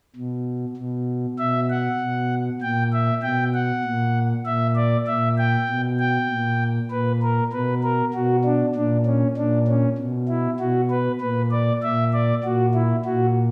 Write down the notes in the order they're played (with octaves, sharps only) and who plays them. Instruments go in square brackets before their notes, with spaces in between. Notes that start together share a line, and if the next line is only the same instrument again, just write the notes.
[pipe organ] B2
B2
B2 E5
F#5
B2
A#2 G5
E5
B2 G5
F#5
A#2
A#2 E5
D5
A#2 E5
G5
B2
G5
A#2
A#2 B4
A#4
B2 B4
A#4
B2 F#4
D4
A#2 D4
C#4
A#2 D4
C#4
B2
E4
B2 F#4
B4
A#2 B4
D5
A#2 E5
D5
A#2 F#4
E4
A#2 F#4